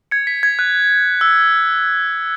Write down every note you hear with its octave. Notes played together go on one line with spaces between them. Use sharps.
G#6 C#7
B6
G#6
F#6
E6